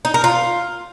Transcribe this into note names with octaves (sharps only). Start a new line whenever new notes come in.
D#4
A#4
F4